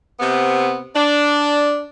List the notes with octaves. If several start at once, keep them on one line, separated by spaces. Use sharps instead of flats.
C3 B3
D4